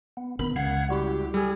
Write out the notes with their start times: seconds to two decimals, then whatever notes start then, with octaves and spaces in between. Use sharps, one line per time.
0.17 B3
0.39 B2 D#3 B3 B5
0.56 C#2 F5 F#5 G#6
0.90 G3 E4 F#4 G4
1.34 G3 G#4 A4